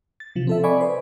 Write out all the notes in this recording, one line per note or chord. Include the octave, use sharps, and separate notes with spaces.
A6
C3 F3
C4 A4 E5
D5 D#5 G#5 B5 C#6 D6
B4 C5